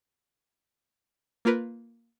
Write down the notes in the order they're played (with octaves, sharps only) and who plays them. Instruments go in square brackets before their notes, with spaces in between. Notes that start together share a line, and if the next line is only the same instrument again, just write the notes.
[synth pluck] A#3 F4 A#4 B4